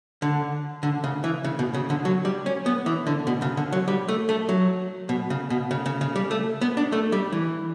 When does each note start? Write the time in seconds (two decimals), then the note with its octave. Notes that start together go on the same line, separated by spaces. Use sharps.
0.22 D3
0.83 D3
1.04 C#3
1.24 E3
1.44 C#3
1.59 B2
1.74 C#3
1.90 D3
2.05 F#3
2.25 G3
2.46 C#4
2.66 B3
2.86 E3
3.07 D3
3.27 B2
3.42 C#3
3.57 D3
3.72 F#3
3.88 G3
4.09 A3
4.29 A3
4.49 F#3
5.09 B2
5.30 C#3
5.50 B2
5.71 C#3
5.86 C#3
6.01 C#3
6.16 G3
6.31 A3
6.61 B3
6.77 D4
6.92 A3
7.12 G3
7.32 E3